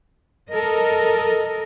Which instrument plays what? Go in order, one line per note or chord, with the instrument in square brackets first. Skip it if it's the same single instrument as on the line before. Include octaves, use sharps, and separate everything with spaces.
[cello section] A4 A#4 D#5